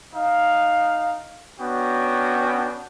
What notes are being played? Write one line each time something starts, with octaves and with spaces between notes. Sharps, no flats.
D#4 F5
B3 C#4 D4 F#4 G5